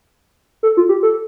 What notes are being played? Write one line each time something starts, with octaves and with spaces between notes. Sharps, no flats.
A4
F4
G4
A4